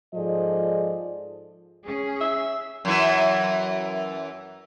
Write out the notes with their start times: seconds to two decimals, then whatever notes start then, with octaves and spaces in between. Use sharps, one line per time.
0.15 G#2 F3 G#4 A4 D5 D#5
1.85 C#4 G#4
2.21 E5
2.85 F#2 E3